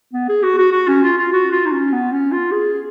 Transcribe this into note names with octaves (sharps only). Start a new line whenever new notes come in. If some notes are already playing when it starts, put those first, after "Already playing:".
B3
G#4
F#4
F#4
F#4
C#4
F4
F4
F#4
F4
D#4
C#4
B3
C#4
F4
G#4